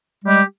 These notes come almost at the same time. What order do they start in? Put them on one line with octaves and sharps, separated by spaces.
G3 G#3 G4